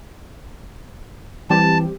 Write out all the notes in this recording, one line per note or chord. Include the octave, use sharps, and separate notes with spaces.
E3 G3 C4 G4 A5